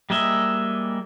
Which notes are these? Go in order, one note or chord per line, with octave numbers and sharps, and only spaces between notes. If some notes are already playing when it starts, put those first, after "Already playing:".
G3 G#3 A#3 D#5 E5